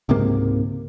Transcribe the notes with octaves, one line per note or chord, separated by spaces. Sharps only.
C#2 G#2 C3 A#3